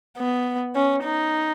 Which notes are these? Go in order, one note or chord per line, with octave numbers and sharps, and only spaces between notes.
B3
C#4
D#4